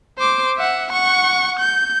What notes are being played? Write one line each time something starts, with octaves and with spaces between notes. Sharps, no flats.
C5 D6
E5 F#5
F#5 C#6
G6